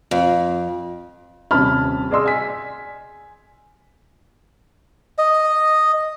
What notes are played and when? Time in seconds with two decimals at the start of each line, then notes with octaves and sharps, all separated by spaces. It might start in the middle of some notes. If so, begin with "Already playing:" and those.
0.11 F2
1.51 D#1 C3 C#4 A5 B5 F6
2.11 G#4 D5 D#5 C6 E6
2.26 G#5 B6
5.18 D#5